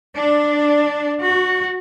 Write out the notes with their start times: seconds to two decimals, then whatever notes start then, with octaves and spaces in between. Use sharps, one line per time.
0.17 D4
1.24 F#4